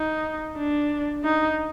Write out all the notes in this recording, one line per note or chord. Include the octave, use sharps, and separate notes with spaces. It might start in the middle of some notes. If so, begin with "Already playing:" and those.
Already playing: D#4
D4
D#4